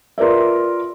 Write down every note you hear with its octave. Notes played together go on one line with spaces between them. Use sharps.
F4 A#4 B4 D5 E5